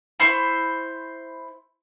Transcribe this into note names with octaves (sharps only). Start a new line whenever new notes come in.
E4 C5 C6 C#6